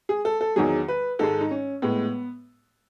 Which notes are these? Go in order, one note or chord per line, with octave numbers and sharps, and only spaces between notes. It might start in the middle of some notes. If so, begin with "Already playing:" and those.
G#4
A4
A4
E2 D#3 F#3 G#4
B4
G#2 D#3 G#3 A4
D#4
C#4
A2 G#3 B3